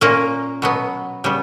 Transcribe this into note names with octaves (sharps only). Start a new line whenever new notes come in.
A#2 A#3 C#4
B2 F#3 B3
C#3 G3 B3